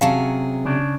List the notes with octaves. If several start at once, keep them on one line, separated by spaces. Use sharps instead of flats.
C3 F#3 C#4 G#4 F5 A5
C#3 D4